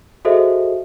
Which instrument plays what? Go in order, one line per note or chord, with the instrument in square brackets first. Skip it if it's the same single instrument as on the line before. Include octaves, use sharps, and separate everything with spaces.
[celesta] F#4 G#4 A4 C5 D#5 E5